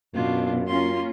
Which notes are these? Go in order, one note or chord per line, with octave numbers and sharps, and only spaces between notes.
F#2 B2 D4 F4
A#3 C#4 F4 C6